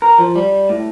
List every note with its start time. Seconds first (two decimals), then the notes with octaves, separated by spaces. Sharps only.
0.02 A#4
0.18 F3
0.36 G3
0.69 A2